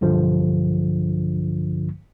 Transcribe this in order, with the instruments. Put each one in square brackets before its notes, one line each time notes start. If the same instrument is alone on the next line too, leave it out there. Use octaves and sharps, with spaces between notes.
[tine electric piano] B1 G2 D3 F3